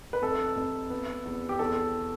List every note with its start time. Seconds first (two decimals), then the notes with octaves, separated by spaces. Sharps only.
0.13 B4
0.22 F1 A4
0.56 F1
0.90 B3
1.25 E2
1.49 G4
1.59 E2 A4